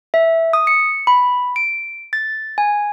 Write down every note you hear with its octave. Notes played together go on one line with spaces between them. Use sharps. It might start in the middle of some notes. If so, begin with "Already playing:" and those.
E5
D#6
C#7
B5
D7
A6
G#5